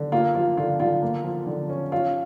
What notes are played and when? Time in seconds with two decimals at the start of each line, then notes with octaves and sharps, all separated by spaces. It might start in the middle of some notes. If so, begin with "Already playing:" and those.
Already playing: D3
0.12 A#3 F4
0.35 F3 F4
0.57 D3 F4
0.80 D3 F4
1.02 A#3
1.24 F3
1.47 D3
1.69 C#4
1.92 C#4 F4